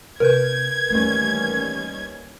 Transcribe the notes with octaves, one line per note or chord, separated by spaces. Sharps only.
C3 A#4 B4 G6 G#6
D#2 E3 G3 A3 C#4